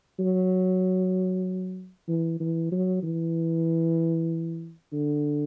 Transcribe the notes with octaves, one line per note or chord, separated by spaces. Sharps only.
F#3
E3
E3
F#3
E3
D3